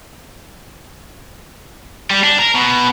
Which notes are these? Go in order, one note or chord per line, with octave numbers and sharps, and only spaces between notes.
G3
D4
A#4
B2